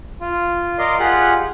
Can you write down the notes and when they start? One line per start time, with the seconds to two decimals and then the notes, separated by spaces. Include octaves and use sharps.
0.21 F4
0.79 A#4 D5 D#5 F5 C6
0.99 F4 G4 G#4 F#5 F#6